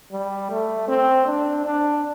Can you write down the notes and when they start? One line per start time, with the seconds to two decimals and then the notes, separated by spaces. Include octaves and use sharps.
0.12 G3
0.51 A3
0.88 C4
1.26 D4
1.65 D4